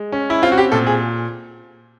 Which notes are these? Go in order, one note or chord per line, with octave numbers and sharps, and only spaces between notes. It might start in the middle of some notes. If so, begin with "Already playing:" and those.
Already playing: G#3
C#4
E4
C4 F4
F#4
G4
A#2 A4
G#4